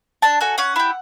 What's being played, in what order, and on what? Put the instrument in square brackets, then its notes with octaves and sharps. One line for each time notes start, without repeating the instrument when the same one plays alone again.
[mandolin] D4 A5
F#4 A4 G#5
C#4 F#5
E4 G4